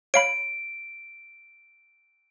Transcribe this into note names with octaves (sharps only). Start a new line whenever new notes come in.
C#5 F5 B5 D7